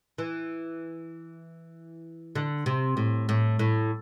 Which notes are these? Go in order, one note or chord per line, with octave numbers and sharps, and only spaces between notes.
E3
D3
C3
A2
A2
A2